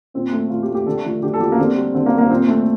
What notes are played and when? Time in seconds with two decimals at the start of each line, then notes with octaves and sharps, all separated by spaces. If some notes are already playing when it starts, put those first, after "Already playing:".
0.14 A#2 C4
0.32 A3
0.50 A#2 F4
0.63 G4
0.69 A3
0.75 G4
0.86 D3 A4
1.04 F3 A3
1.22 D3 G4
1.34 A4
1.40 F3 A3 G4
1.52 A#3
1.58 D3 C4
1.76 G3
1.94 D3 C4
2.06 A#3
2.12 G3
2.18 A#3
2.30 A#2 C4
2.48 A3